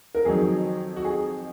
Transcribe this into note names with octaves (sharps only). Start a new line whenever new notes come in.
A#4
F2 D#3 F#3 G#4
F#4
G#4